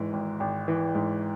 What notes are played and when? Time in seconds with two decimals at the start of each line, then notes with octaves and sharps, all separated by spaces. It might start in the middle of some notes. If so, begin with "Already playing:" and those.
Already playing: G#1 G#2 E3
0.13 G#1
0.40 G#1
0.68 E3
0.95 G#2